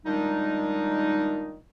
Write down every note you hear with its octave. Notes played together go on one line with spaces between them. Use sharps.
A#2 D#3 G3 G#3 D4 D#4